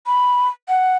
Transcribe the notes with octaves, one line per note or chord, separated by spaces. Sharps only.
B5
F#5